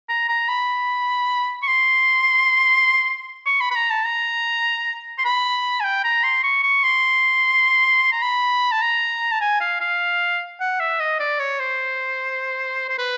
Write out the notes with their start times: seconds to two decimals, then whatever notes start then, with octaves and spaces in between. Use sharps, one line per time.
0.09 A#5
0.29 A#5
0.49 B5
1.63 C#6
1.68 C6
3.46 C#6
3.61 B5
3.71 B5
3.76 A#5
3.91 A5
4.06 A#5
5.19 C6
5.25 B5
5.80 G#5
5.84 G5
6.04 A#5
6.24 C6
6.44 C#6
6.63 C#6
6.83 C6
8.12 A#5
8.22 B5
8.72 A5
8.82 A#5
9.32 A5
9.41 G#5
9.61 F5
9.81 F5
10.60 F#5
10.80 E5
11.00 D#5
11.20 D5
11.40 C#5
11.60 C5
12.89 C5
12.98 B4